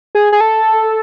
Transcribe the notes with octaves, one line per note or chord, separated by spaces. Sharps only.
G#4
G#4
A4